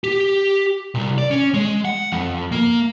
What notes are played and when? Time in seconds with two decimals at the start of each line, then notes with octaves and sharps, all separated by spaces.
0.04 G4
0.95 C2
1.18 D5
1.31 C#4
1.54 G#3
1.85 F#5
2.12 F2
2.52 A#3